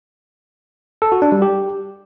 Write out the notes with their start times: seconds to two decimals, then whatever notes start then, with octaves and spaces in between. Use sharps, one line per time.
1.02 A4
1.12 F#4
1.22 D4
1.32 G3
1.42 G4